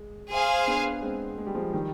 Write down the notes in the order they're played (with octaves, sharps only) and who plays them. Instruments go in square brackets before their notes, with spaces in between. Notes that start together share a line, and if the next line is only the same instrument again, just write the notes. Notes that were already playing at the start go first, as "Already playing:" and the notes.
Already playing: [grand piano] G#3
[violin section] G#4 C5 F5 G#5
[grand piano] B3 D4
G#3 C4
G#3
G3
F3 G#3
D#3 G3